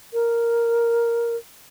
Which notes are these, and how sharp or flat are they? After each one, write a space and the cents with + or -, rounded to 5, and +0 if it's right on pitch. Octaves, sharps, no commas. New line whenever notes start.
A#4 +0